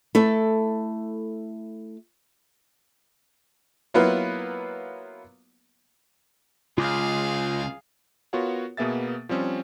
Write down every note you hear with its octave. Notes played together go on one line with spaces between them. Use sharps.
A3 E4 A4
F#3 A#3 B3 E4 F4 B4
C#2 F4 G#4 F5 D6 F6
B3 F4 F#4 A#4 C#5 F#5
B2 A#3 B3 G#4 E5 A6
F3 G3 C4 C#4